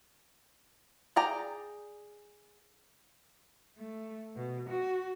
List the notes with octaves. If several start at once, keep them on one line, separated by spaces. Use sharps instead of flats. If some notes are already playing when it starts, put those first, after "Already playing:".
G#4 D5 G5 A#5
A3
B2
F#4